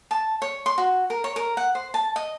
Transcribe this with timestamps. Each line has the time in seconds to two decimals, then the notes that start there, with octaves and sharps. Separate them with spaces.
0.11 A5
0.42 C#5
0.66 C6
0.78 F#4
1.10 A#4
1.24 C#5
1.36 A#4
1.57 F#5
1.75 C5
1.94 A5
2.16 D#5